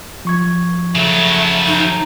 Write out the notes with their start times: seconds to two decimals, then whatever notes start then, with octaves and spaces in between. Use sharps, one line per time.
0.25 F3 C#6 G#6
0.96 C#3 F#3 A3 A5
1.67 D#4